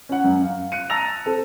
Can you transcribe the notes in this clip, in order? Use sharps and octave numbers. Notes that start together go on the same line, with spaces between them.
C#4 F#5
F#2
F5
F#6 C#7 D#7
A5 A#5 E6 A6 A#6 F7
C4 A4